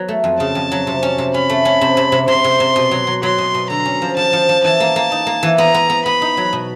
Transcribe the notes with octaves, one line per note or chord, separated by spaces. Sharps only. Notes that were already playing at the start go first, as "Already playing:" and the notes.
Already playing: F#3 B3
A3
F2
C#3 A5
F2
F#3
C3
C#4
C3
C#4 B5
A3
C#4
C3
C3
C3
C3 C6
C3
C3
B2
F#3
F#3
F#3 C6
B2
B2
D3 A#5
C#4
F3
F3 A5
F3
F3
E3 A5
A#3
A#3
D#4
A#3
E3
B3 A#5
B3
B3
B3 B5
D#4
F#3
B2